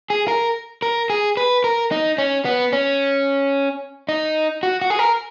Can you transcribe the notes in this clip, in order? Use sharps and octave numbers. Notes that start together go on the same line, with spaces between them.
G#4
A#4
A#4
G#4
B4
A#4
D#4
C#4
B3
C#4
D#4
F#4
F#4
G#4
A#4